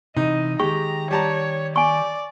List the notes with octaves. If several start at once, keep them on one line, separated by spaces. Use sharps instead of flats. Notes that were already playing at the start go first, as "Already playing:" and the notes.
C3 E3 D#4 D#5
D#3 G#3 G4 G5 A#5 C#6
G3 C#5 A5 A#5
D5 G#5 C#6